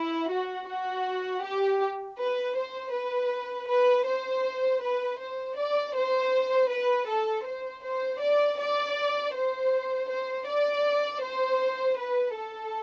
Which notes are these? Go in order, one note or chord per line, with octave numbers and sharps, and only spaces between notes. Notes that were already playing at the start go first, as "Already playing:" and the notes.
Already playing: E4
F#4
F#4
G4
B4
C5
B4
B4
C5
B4
C5
D5
C5
B4
A4
C5
C5
D5
D5
C5
C5
D5
C5
B4
A4